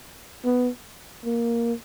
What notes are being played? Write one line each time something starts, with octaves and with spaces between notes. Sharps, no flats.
B3
A#3